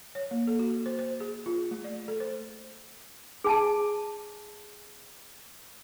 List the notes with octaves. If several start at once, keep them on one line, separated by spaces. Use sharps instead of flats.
C#5
A#3
A4
F#4
C5
C5
G#4
F4
A3
D5
A4
C5
G#4 G#5 A5